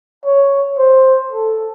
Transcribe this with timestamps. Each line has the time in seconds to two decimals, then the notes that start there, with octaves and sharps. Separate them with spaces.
0.25 C#5
0.78 C5
1.32 A4